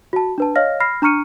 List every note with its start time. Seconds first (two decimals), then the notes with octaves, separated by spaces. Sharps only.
0.13 F#4 A5
0.38 D4 B4 A5
0.56 C#5 D#5 F5 F6 A#6
0.80 B5 F6 A#6 C7
1.02 D4 A#5 C#6 F6 C#7 D#7